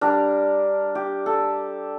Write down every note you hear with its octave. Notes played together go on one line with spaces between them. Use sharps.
G3 D4 A#4
G4
A4